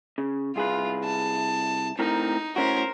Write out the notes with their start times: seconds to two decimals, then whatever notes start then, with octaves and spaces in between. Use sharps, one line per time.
0.18 C#3
0.56 C2 F4 G#4 B4
1.05 A5
1.99 A2 C4 D#4 A#4
2.56 A2 C#4 F#4 A#4 C5